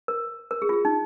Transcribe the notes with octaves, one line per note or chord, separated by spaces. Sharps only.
A#4
A#4
G#4
F4
G#4
D#4